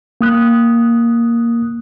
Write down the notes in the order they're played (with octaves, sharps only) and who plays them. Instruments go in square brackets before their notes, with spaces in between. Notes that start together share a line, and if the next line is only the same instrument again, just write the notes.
[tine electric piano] A#3 D#6 F#6